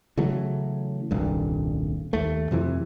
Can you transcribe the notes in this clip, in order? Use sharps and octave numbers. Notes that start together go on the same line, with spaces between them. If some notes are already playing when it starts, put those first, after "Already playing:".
C#3 E3 F#3 A3
D#1 C2 G2
D#2 A3
F2 C3 E3